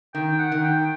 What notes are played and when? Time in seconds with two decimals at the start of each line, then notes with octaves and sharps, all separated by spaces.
0.14 D#3 G5
0.38 F#5
0.52 D#3
0.64 G5